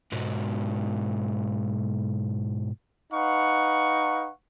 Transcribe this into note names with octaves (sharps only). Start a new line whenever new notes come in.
G#2 B2
D#4 B4 F5 F#5 C#6